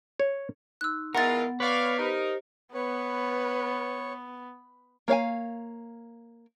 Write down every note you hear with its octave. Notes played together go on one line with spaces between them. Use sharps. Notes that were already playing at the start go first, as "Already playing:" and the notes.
C#5
D#4 C6 E6 F#6
E3 G#3 B3 F4 A#4 F#5 A6
B4 C#5 D5 F5
D#4 G4 A#4 C5
B3 B4 C#5
A#3 C#5 F5 G#5